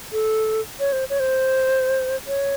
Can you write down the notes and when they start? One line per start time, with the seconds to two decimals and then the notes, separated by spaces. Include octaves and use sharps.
0.12 A4
0.80 C#5
0.92 C5
1.10 C#5
1.20 C5
2.27 C#5